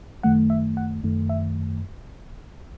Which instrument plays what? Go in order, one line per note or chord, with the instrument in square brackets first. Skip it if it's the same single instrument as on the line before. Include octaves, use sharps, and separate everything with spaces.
[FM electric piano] F#2 D#3 A3 F#5
E5
F#5
F#2 D#3 A3
E5